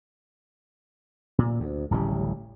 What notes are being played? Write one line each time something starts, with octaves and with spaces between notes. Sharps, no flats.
A#2
D2
D1 A1 C#3 G3